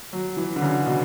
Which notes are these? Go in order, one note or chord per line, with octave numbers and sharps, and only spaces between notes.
F#3
E3
D3
C#3
B2